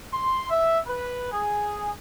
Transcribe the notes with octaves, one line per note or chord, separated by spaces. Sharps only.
C6
E5
B4
G#4